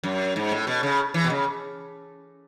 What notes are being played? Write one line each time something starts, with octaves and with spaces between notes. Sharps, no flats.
F#2
G#2
A2
B2
C#3
E3
B2
C#3